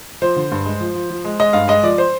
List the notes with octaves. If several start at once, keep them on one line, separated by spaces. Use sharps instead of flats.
F3 C5
D3
G2
G#3
F3
F3
F3
G#3
G#3 D#5
G2 F5
G#3 D#5
F3 D5
C5